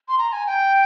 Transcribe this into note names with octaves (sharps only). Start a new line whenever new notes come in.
C6
A#5
G#5
G5